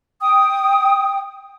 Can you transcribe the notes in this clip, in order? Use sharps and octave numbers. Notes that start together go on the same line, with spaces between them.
G5 D#6